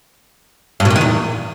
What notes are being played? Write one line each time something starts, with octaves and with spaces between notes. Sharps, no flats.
G2
B2
A#2
D#3
E2